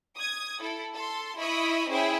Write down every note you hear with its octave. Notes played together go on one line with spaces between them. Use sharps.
D#6 G#6
E4 A4
A4 C6
E4 D#5 E5 B5 C#6 D#6
C#4 E4 G#4 C5 E5 G5